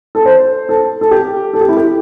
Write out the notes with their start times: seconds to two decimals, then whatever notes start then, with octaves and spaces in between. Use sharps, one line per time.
0.15 A4
0.26 C5
0.69 A4
1.01 A4
1.11 G4
1.54 A4
1.61 G4
1.69 E4
1.77 G4